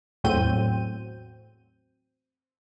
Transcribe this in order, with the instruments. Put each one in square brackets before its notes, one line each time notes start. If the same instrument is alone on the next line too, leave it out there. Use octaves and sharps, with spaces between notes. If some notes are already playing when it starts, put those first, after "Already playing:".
[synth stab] E2 A2 F#3 C4 G6 D#7